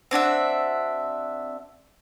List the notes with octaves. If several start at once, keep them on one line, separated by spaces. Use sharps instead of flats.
C4 D4 F#4 E5